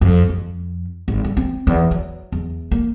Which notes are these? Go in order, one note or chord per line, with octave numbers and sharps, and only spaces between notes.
F2
F2
G#1
G3
C4
E2
F#3
E2
A#3